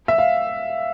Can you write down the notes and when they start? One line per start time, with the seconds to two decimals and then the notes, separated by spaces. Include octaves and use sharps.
0.08 E5
0.18 F5